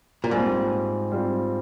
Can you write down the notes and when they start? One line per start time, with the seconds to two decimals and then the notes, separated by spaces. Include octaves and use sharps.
0.24 A#2
0.31 G#2 G3 C4 F4
1.12 G3 C4 F4